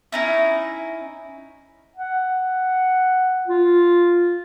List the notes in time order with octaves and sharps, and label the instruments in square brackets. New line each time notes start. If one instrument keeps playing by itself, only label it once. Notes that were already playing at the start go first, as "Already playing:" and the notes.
[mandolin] C#4 D#4 E4
[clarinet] F#5
F4